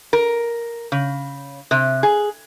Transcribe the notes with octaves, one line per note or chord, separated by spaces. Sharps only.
A#4
C#3
C3
G#4